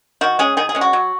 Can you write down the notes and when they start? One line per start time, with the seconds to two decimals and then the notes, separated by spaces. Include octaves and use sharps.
0.21 D#3 F#4
0.39 G#3 C#4 G#4
0.57 D#3 G#4
0.69 G#4
0.75 G#3 C#4
0.81 F#4
0.93 F#3